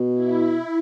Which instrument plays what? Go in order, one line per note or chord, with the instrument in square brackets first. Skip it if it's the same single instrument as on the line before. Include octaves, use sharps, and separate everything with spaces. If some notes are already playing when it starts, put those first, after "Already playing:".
Already playing: [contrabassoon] B2
[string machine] E4